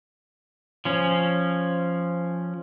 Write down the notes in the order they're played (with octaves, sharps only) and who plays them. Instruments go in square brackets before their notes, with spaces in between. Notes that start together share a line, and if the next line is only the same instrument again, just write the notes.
[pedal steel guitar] F3 C#4